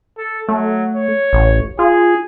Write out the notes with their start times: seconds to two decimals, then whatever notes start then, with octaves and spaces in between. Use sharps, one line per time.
0.18 A4
0.49 F#3 A3
0.95 C#5
1.33 A1
1.79 F4 G#4